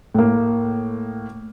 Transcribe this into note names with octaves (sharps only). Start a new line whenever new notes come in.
A2 A#3